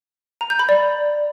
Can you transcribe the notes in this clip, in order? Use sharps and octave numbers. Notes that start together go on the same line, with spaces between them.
A#5
G6
B5
D5